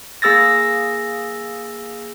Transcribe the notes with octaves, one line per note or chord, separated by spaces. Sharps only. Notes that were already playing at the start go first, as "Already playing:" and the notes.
A#3 G#4 E6 A6 A#6